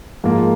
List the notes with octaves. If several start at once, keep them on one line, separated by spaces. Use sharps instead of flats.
G#2 F3 A#3 F4